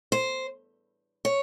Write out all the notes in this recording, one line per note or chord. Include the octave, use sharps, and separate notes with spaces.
C5
C#5